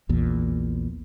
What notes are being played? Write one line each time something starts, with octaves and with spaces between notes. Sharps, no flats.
A#1 E2 A#2